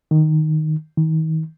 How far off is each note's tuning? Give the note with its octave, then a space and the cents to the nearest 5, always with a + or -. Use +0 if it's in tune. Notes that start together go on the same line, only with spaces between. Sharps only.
D#3 -5
D#3 +35